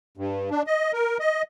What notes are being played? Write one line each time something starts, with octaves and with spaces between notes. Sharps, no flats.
G2
D4
D#5
A#4
D#5